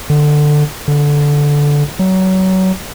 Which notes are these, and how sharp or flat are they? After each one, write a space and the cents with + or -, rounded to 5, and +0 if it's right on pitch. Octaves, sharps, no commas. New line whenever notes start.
D3 +15
D3 -10
F#3 +25